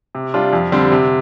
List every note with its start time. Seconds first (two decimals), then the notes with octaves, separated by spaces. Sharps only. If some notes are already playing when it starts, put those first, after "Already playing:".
0.15 C3
0.34 G3 D4 F4
0.53 F2
0.72 D3 G3 C4
0.92 C3